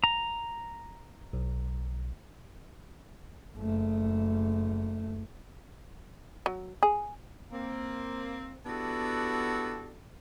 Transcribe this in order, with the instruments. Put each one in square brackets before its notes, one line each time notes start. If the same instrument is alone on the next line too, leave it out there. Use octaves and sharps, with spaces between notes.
[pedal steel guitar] A#5
[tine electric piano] B1
[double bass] F#1 A3
[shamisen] F#3
G#4
[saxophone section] A#3 C4
B3 D4 E4 F#4 G4 A4